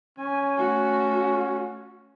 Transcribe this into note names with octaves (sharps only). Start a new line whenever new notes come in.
C#4 G#5
A3 F#4